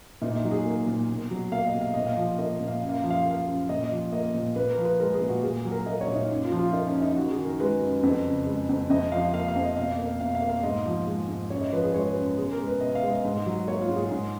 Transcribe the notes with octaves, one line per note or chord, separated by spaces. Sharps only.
A#2 D#4
D#4
F#3
G#4
A#3
A#2
B2
F#3
A#3 F5
D#5
B2
F5
A#2 D#5
F5
F3
A#3 D#5
A#2
F5
F#2
F5
F3
F5
A#3
F5
F#2
A#2 D#5
D#5
F3
A#3 D#5
A#2
A#2 B4
A#4
F3
B4
G#3 A#4
G#4
A#2
F#4
A#2 G#4
F#3
A#4
A#3 D#5
C#5
A#2
D#4
F#2
F4
F3
F4
A#3 D#4
C#4
F#2
D#4
F#2 F#4
G#4
D#3
A#4
G#3 B4
F#2
F2
C#3
G#3
F2
F2 D#5
F3 F5
A#3 F5
F5
F2
D#5
B2 F5
A#3
B2 F5
F5
A#3
F5
G#2 D#5
F3
G#3
G#2
F#2 C#5
D#5
F3 B4
G#4
G#3 C#5
B4
F#2
B2 G#4
A#4
G#3
B4
B2 D#5
F5
G#3
D#5
G#2
F#3
A#3 C#5
F4
G#2
G#4
G#2